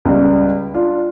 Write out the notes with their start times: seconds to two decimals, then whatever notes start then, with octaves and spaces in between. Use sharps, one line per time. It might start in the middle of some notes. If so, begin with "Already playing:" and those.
0.05 C#2 G3
0.74 D4 F4